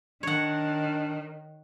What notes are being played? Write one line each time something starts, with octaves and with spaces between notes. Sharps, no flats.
D#3 D4 C#5 F#5